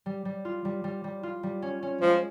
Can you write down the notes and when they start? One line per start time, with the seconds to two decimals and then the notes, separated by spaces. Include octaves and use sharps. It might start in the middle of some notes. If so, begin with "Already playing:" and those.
0.06 G3
0.25 G3
0.45 F4
0.65 G3
0.84 G3
1.04 G3
1.23 F4
1.43 G3
1.62 C#4
1.83 C#4
2.01 F3 G#3